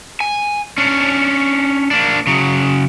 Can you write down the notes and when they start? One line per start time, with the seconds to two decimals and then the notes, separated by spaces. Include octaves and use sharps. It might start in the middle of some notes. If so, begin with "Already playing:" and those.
0.21 G#5
0.78 C#4 D4
1.91 A#3 D4
2.27 C#3 F#3